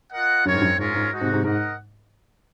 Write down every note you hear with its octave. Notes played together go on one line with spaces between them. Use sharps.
F4 A#4 D#5 F#5
F#2 C4 F4 A#4 C#5
G#2
F#2
G#2 G#3 C#4 F4 A#4 C#5
G#2
G#3 D#4 F#4
G#2 C3
G#2 C3
G#2 D#4 A#4 D#5 F#5